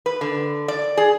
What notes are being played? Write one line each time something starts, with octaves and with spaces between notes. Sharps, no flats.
B4
D3
D5
G#4